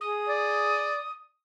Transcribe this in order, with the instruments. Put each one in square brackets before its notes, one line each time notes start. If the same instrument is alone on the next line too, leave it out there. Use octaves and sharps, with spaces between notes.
[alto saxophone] G#4 [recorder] D#6
[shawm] D5